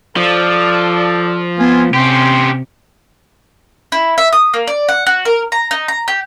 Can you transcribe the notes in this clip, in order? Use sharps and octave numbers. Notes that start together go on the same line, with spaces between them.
F3 A4 D5
B3 C4 F4 G#5
C3 C#4 G4 G5 C6
E4
E5
D#6
A#3
D5
F#5
F#4
A#4
A#5
D#4
A#5
G4